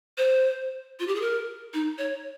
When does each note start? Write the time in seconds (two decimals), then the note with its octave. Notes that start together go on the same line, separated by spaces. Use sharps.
0.18 C5
1.00 F4
1.08 G4
1.15 G#4
1.22 A#4
1.74 D#4
1.98 C#5